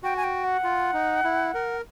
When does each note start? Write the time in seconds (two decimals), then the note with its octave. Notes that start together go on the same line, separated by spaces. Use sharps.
0.03 F#4 G5
0.17 G#5
0.24 G5
0.44 F#5
0.64 F4
0.94 D#4
1.24 E4
1.54 A#4